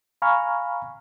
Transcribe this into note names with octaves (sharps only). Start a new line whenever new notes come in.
F5 G#5 A#5 B5 C#6 F6